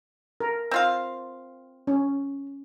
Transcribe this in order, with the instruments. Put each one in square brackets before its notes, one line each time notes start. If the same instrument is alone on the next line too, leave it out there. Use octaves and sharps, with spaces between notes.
[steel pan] A#4
[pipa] C4 F4 F5
[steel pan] C#4